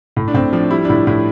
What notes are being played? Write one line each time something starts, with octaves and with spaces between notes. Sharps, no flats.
A2
D4
A2 C4
F3 D4
G3 E4
D4
A2 E4
A2 E4